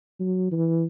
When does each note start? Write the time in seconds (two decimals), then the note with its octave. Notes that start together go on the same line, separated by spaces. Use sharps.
0.20 F#3
0.52 E3